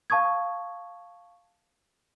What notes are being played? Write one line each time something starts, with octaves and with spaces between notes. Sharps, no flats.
F5 A5 C#6 D#6 G#6